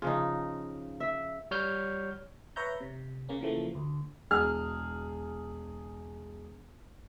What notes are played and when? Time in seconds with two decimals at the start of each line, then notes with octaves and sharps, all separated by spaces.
0.02 C#3 F3 D#4 F4
1.00 E5
1.51 G3 C#5 F6 G6
2.56 B4 C#5 E5 A#5 G6
2.80 C3
3.29 C#3 A#3 C#4
3.41 C#3 E3 F3 A3 A#3
3.75 D2
4.31 E1 G#4 F6